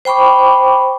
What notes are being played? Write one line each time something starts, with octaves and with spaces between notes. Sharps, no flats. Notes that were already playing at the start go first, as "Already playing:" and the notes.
C5 G5 B5 C#6 D6